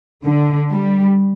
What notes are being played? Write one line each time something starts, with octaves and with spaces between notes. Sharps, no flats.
D3
G3